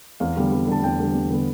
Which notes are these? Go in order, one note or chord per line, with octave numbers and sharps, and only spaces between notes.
E2 F5
D3 G3 B3
E2
D3 G3 B3 A5
E2 G5
D3 G3 B3
E2
D3 G3 B3